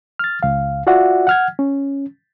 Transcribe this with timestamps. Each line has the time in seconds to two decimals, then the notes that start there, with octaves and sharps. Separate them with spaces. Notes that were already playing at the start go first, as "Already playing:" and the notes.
0.19 F6 A6
0.43 C#2 F5
0.87 F4 F#4 D5 E5 F#5
1.27 F#5 F6 G#6
1.59 C#4